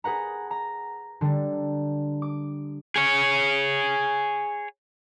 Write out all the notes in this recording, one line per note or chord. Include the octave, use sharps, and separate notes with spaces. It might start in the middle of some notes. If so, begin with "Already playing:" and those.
G#4 B4 F#5 A#5
A#5
D3 G3
D6
G#4 C#5